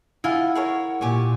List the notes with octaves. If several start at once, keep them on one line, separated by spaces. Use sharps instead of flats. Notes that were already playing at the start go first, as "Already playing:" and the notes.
E4 F4 D#5 F#5 G#5
G#4 A#4 C#5
A#2 G4 G#5 C#6